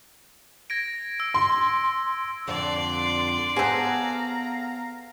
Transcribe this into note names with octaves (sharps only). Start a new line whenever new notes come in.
G#6 A#6 D7
E6
C6
F2 D3 D4 D5 C6
B3 G#4 A4 C5 F5 A#5